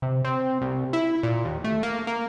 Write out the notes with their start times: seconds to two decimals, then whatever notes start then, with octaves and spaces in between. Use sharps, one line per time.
0.02 C3
0.25 C4
0.61 C2
0.93 E4
1.23 A#2
1.45 D#2
1.64 A3
1.83 A#3
2.07 A#3